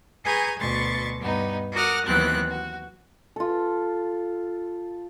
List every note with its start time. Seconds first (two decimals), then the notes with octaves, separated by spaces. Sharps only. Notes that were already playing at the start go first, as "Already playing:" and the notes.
0.25 G#4 B4 G#5 A#5 C#6 G6
0.58 D2 B2 C6 C#6 A6
1.18 G2 B3 D#4
1.73 F#4 A#4 F#5 D6 D#6 F6
2.05 D#2 E3 F#3 B3 C4 F#6
2.50 F#4
3.36 F4 A4